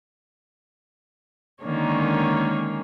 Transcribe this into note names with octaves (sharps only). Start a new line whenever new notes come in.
D3 D#3 G#3 A#3 C#4 C#5